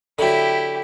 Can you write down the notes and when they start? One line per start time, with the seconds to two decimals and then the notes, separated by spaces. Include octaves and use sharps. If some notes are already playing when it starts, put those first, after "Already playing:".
0.19 D3 F#3 E4 G4